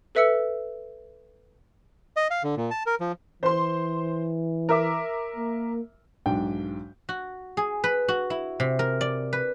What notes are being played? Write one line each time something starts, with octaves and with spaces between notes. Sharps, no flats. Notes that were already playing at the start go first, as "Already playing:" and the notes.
A4 B4 E5 E6 C#7
D#5
F5
D3
A#2
A5
A#4
F3
E3 C5 C6
A#4 E5 D6
A#3
B1 G#2 D4 G5
F#4
G#4
B4
F#4
E4
C3
A#4
D5
B4